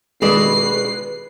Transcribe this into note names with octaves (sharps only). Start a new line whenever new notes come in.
B2 D#3 G#3 B4 D5 C7